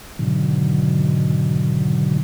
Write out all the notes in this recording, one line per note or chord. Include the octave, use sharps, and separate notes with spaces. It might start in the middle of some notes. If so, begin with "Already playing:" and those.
G#2 B2 D3 D#3 F#3